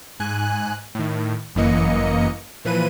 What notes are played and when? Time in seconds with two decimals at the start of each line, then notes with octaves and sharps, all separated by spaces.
0.20 G#2 G#5 F#6
0.95 A2 D#3
1.55 G1 F#2 E3 A#3 D#5 C#7
2.65 A#2 E3 F3 B4 D#7